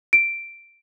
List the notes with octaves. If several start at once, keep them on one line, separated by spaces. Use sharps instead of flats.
D7